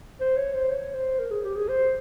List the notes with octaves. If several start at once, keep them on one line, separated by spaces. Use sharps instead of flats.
C5
C#5
C5
C#5
C5
A#4
G#4
G4
G#4
C5